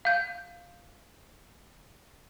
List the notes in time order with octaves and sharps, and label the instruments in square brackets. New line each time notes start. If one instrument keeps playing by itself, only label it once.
[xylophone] F5 G6